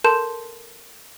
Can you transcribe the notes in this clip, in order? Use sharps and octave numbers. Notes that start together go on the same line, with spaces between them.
A4 A#4 A5 C6 G6 E7